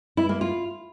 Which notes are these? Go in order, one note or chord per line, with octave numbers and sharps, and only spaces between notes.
E4
A#3
F4